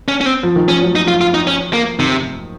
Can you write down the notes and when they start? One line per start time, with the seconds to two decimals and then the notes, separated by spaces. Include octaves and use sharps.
0.08 C#4
0.21 C#4
0.26 C4
0.43 F3
0.56 D#3
0.68 F3 C#4
0.83 F#3
0.95 F3 D#4
1.08 F4
1.21 F4
1.34 D#4
1.47 C#4
1.73 A#3
1.99 C3 D#3